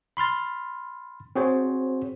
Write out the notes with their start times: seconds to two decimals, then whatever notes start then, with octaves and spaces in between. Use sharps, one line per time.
0.17 B5 C6 F6 A6
1.36 C4 F#4 G#4 C5 C#5